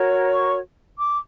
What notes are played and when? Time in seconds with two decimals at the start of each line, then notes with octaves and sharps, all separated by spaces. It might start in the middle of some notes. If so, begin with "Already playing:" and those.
Already playing: F#4 A#4 C#5
0.32 C#6
0.98 D6